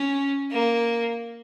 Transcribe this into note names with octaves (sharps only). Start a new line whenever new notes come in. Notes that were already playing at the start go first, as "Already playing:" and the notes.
Already playing: C#4
A#3